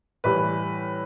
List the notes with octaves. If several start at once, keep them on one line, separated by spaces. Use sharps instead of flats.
A2 E3 G3 B4